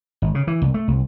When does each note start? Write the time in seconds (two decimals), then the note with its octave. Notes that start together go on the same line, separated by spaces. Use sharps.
0.22 G#1
0.35 C#3
0.47 E3
0.62 C2
0.74 A3
0.88 C2